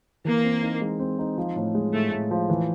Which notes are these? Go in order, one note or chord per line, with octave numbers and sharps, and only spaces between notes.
E3 A#3
C4
D#4
G#3
C4
D#4
F3
A2
G#3
A2 A3
A2
F3
E3